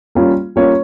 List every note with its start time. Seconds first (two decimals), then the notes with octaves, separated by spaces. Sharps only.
0.15 G3 A#3 C#4 F4
0.56 G3 A#3 C#4 F4 C#5